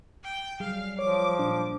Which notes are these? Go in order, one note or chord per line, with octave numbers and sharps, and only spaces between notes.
G5
F#3 G3 G#4 F5
F3 C#5 D6
A#2 D4